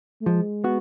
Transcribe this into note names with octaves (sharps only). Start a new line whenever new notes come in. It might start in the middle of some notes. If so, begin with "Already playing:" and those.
A3
F3 G#3
B3 F#4